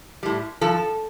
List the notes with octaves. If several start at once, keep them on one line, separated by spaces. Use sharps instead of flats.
A2 G3
G2 F3 A4